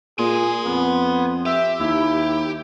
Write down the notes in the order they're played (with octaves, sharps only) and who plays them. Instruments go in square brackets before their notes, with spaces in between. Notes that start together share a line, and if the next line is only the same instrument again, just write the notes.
[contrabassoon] A#2 [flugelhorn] G#4 [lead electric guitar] G#5 C6
[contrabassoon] F2 [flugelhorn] B3
[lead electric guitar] G4 [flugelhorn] E5
[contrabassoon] D#2 [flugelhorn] E4